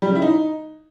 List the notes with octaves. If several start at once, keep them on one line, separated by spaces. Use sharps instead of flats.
G3
C#3
E4
D#4